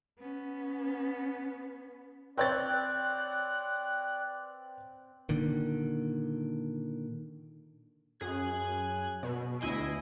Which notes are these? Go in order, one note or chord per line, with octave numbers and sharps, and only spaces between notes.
B3 C#4
C4 B4 C#5 D5 G5 F#6 A6
A#2 D3 D#3
F#2 G#4 F#6 G#6
B2
D2 E4 D#5 G#5 C7 D7